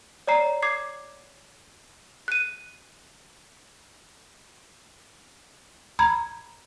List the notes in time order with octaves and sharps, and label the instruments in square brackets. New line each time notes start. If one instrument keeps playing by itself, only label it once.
[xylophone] C#5 D5 A#5 C7
D6 G#6 C7
F#6 D#7
[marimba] A#5 B5 G#6